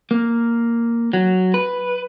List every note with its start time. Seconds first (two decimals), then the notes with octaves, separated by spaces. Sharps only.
0.11 A#3
1.13 F#3
1.54 B4